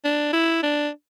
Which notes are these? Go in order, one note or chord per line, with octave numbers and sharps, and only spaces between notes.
D4
E4
D4